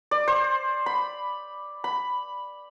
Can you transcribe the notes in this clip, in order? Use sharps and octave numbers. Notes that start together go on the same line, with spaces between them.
D5
C5
B5
B5